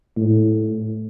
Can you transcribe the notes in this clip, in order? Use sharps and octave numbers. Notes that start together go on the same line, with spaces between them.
A2